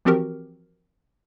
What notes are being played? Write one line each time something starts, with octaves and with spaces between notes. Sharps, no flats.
E3 F3 C4 F#4 G4 A#4